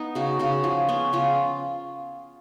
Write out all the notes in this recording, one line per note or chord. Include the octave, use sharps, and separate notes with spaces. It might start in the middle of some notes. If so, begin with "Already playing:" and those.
Already playing: B3 D#4
C#3 F#4
C#3 F#4
F3 G#4
B3 C#4
C#3 F4